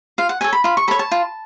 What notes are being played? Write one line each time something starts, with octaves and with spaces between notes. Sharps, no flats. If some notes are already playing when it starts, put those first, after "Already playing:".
F4 F5
F#5
A4 C#5 G#5
B5
F4 B5
C#6
A4 C#5 B5
A5
F4